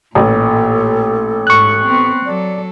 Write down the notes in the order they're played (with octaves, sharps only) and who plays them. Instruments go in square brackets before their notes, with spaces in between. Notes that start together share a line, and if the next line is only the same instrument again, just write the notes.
[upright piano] A1 [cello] A#2 [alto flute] A4
[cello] G#2 [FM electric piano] C#6 F#6
[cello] B3 C4
[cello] F#3 A4 [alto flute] D5